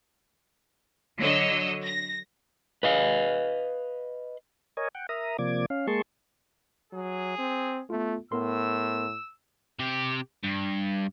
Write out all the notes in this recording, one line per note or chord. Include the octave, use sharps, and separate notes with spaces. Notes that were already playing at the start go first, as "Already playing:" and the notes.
D3 F#3 C#5 D#5 E6
A#6
B4 D#5 F5
A#4 C#5 D#5 G#5
F#5 G5
A#4 E5 A#5 D#6
C3 F3 A#3 D5 D6 G#6
C#4 F5
G#3 A#3 G#4 A5 C6 C#6
F#3 G#4
C4
A3 B3 F4
A2 B3 A#4 C6 E6
C3 G4
G2